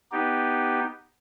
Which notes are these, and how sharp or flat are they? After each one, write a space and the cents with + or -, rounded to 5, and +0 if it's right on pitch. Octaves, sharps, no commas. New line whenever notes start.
B3 +0 D#4 +0 G4 +0